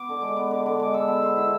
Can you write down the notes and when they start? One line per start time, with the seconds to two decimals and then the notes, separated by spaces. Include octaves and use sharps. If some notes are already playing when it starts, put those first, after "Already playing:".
Already playing: B3 D6
0.09 D3
0.22 G#3
0.36 B3
0.51 D3 D6
0.65 D3 D6
0.80 G#3 D6
0.94 A4 E6
1.08 B3
1.22 C5
1.37 E4